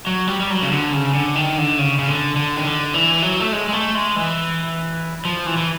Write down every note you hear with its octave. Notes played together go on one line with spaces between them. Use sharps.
F#3
G3
G3
F#3
C#3
D3
C#3
D3
D#3
D3
C#3
C#3
D3
D3
D#3
D3
E3
F#3
A3
G#3
G#3
A3
G#3
E3
F3
E3
E3